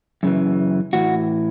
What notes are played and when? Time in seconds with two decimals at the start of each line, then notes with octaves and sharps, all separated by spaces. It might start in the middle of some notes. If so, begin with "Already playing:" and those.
0.23 F#2 C#3 E3
0.93 A2 E3 F#4